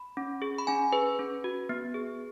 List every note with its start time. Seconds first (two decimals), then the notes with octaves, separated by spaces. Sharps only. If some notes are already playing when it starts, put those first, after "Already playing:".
Already playing: B5
0.17 C#4
0.42 G#4
0.58 B5
0.67 C#4 G#5
0.93 G#4 B4
1.19 C#4
1.44 F#4
1.69 B3
1.94 G#4